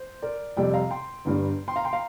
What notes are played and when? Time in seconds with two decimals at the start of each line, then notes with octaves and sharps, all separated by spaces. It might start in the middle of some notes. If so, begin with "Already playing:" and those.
Already playing: C5
0.22 A#4 D5
0.57 F2 C3 G3 D5 G5
0.73 F5 A#5
0.91 G5 C6
1.25 G1 G2 G3
1.68 G5 C6
1.76 F5 A#5
1.85 G5 C6
1.93 F5 A#5